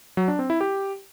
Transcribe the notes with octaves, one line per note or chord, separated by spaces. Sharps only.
F#3
D4
C4
E4
G4